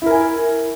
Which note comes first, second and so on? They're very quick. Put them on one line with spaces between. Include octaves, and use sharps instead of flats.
E4 A#4 G#5